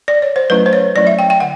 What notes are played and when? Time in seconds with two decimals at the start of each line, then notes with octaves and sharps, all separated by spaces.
0.08 D5
0.22 C#5
0.36 C5
0.50 F#3 A3 C#4 E4 B4
0.66 C5
0.73 C#5
0.96 F#3 A3 C#4 E4 D5
1.07 E5
1.19 G5
1.30 G5
1.40 D3 F#5